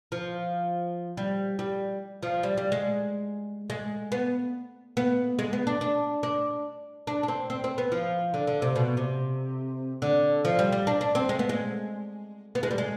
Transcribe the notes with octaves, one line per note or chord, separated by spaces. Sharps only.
F3
G3
G3
F3
G3
G3
G#3
G#3
B3
B3
G#3
B3
D4
D4
D4
D4
D4
C4
C4
C4
B3
F3
D3
D3
C3
B2
C3
D3
F3
G3
G3
D4
D4
C4
G#3
B3
G#3
B3
G#3
G3
G#3